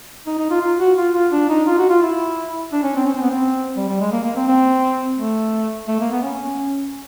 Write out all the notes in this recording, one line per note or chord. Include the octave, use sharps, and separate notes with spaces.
D#4
D#4
F4
F4
F#4
F4
F4
D4
D#4
F4
F#4
F4
E4
D4
C#4
C4
C#4
C4
B3
C4
G3
G3
G#3
A#3
A#3
C4
C4
A3
A3
A#3
B3
C#4